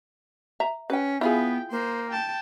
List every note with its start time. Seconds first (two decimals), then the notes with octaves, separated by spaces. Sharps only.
0.60 E5 A#5
0.90 C#4 B4 G5
1.21 B3 E4 F4 G#4 G5
1.71 A#3 C5
2.11 G5 A5